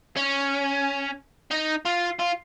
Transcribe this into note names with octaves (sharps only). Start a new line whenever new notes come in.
C#4
D#4
F4
F4